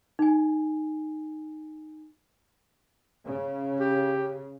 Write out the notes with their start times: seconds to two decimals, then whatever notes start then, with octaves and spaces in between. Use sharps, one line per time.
0.19 D#4 G#5
3.25 C#3
3.80 G4